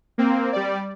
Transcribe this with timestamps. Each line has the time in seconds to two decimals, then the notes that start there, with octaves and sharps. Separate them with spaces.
0.18 A#3 C4
0.52 G3 D5